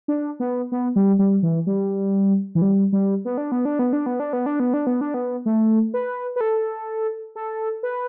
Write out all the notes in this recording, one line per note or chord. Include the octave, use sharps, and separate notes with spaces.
D4
B3
B3
G3
G3
E3
G3
E3
G3
G3
B3
D4
B3
D4
B3
D4
B3
D4
B3
D4
B3
D4
B3
D4
B3
A3
B4
B4
A4
A4
B4